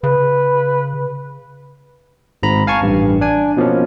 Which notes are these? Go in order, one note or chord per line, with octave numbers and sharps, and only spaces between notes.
C#3 B4
G#1 G#2 A#5 B5
F5 G#5 A5 C#6
A1 G2
D4 G#5
B2 F3 A#3 C#4